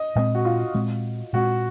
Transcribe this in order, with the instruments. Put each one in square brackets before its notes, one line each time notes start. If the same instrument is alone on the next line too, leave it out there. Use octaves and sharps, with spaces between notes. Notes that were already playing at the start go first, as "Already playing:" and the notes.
Already playing: [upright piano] D#5
[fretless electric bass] A#2 G#3 C4 [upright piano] D#5
[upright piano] F#4
F4
[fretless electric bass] A#2 G#3 C4
[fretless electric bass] A#2 G#3 C4 [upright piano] F#4